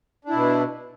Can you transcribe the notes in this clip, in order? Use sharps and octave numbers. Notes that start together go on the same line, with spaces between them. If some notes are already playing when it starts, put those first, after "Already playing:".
B2 D4 E4